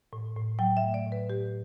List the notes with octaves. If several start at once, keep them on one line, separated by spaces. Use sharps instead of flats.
A2
A2
F#3 G5
E5
A3
D5
A2
B4
A2 G4